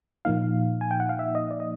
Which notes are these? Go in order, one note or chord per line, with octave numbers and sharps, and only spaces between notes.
A#2 F3 A#3 D#4 F5
G#5
G5
F#5
F5
E5
D#5
D5
D#5